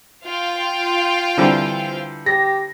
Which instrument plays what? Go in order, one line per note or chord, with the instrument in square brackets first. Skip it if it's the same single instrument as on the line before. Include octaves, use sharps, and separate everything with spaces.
[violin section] F4 F5 G5
[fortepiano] D3 E3 G3 [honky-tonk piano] C4
[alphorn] G4 [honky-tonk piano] A#6